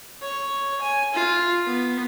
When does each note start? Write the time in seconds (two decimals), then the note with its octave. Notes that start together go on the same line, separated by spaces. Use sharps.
0.22 C#5
0.82 G#5
1.14 F4
1.67 B3